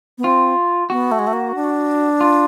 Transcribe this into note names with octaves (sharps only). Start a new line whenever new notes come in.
B3
C4 F4
B3 F#4
A3
G#3
A3
A#3
D4
F4